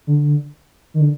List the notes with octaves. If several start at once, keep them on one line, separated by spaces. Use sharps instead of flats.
D3
D#3
D3